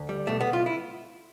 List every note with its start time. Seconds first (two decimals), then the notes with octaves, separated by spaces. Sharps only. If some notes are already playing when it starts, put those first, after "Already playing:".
Already playing: D2
0.09 G3
0.27 B1 A3
0.41 B3
0.47 B1
0.53 F4
0.66 E4